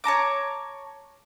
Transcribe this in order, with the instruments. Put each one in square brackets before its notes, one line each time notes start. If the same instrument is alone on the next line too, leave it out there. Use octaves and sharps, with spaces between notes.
[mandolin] C#5 A5 A#5 D6